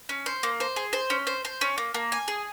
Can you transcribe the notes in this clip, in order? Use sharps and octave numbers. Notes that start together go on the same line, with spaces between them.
C#4
C5
A#3
C5
G#4
C5
C#4
C5
C5
C#4
A#3
A#3
G#5
G#4